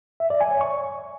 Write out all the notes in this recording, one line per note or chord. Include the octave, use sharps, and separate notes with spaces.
E5
D5
G#5
C#5
C#6